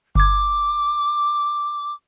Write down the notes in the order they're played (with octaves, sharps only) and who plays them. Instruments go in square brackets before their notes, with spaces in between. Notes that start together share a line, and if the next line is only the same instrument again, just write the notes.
[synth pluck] G1 G#6 [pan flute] D6